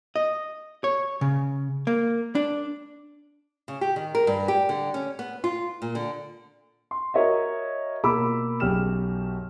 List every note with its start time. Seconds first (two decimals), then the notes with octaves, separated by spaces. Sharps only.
0.16 D#5
0.84 C#5
1.21 C#3
1.87 A#3
2.35 D4
3.68 C#3
3.81 G4
3.96 D#3
4.15 A#4
4.27 G2
4.48 G4
4.69 D3
4.94 C#4
5.19 B3
5.44 F4
5.82 A#2
5.95 D3
6.91 C6
7.14 F#4 A#4 C#5 D#5 E5
8.04 B2 A#3 F4 B5 D6 E6
8.60 B1 F#2 G4 G#4 F6 E7